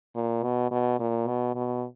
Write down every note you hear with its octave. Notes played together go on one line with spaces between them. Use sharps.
A#2
B2
B2
A#2
B2
B2